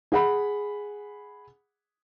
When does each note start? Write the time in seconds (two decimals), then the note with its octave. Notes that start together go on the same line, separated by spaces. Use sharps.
0.12 G#4 F#5 B5